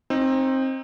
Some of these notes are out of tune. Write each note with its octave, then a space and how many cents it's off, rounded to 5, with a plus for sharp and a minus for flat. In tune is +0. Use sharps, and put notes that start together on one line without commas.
C4 +20 D#4 +0